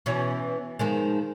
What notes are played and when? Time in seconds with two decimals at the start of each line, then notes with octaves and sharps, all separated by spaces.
0.06 B2 E3 C#4
0.79 D#3 F3 G#3